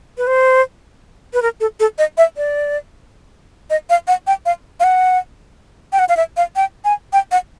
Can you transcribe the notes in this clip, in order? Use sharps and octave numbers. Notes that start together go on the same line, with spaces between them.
B4
C5
B4
A#4
A4
A4
D#5
E5
D5
D#5
F5
F#5
G5
F5
F5
F#5
G5
F#5
F5
E5
F5
G5
G#5
G5
F#5